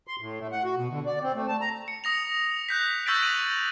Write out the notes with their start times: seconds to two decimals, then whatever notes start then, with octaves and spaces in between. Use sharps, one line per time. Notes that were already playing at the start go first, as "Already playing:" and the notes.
0.07 C6
0.21 A2
0.40 A3
0.52 F#5
0.64 F#4
0.76 B2
0.90 D3
1.06 D5
1.22 C4
1.35 A3
1.48 A5
1.61 A#5
1.88 C#7
2.04 D#6 A#6 F7
2.69 F#6 G6 B6
3.06 C#6 E6 G6 A6 B6 D7
3.22 D7 D#7 F7 F#7